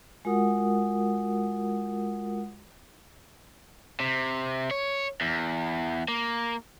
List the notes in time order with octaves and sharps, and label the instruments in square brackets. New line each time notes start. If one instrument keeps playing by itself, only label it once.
[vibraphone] G#3 F4 F#4 A#4 F#5 D#6
[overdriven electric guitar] C3
C#5
E2
A#3